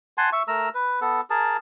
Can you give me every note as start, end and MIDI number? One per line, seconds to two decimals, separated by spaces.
0.18 0.30 78
0.18 0.30 80
0.18 0.30 81
0.18 0.30 84
0.32 0.43 76
0.32 0.43 85
0.48 0.69 57
0.48 0.69 70
0.48 0.69 82
0.48 0.69 88
0.74 1.00 71
1.01 1.21 59
1.01 1.21 69
1.30 1.57 68
1.30 1.57 70
1.30 1.57 81